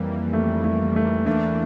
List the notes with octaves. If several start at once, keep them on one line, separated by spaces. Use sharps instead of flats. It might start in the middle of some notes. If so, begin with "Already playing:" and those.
Already playing: F2 E3 G3 A#3
A3
A3
A3
E2 E3 A3 A#3 D4